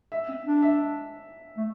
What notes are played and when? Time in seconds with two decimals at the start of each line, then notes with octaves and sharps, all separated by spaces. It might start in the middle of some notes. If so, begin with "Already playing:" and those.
0.12 E5
0.28 C4
0.46 D4
0.62 E5
1.57 A3